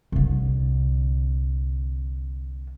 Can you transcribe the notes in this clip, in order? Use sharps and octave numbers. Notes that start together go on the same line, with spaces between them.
C2 D3